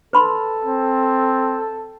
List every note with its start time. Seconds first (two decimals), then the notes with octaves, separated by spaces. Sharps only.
0.13 A4 B4 B5 C6
0.65 C4